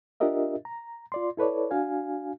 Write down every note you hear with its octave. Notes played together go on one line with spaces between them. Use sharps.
D4 F4 G4 A#4 D#5 E5
A#5
F4 D5 C6
E4 A4 B4 C#5 D5
D4 F#4 F5 G#5